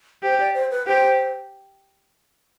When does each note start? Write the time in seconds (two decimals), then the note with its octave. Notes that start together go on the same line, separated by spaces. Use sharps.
0.23 G4 C5
0.39 D5
0.54 C5
0.71 B4
0.87 G4 C5